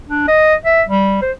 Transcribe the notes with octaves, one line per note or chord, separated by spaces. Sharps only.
D4
D#5
E5
G3
C5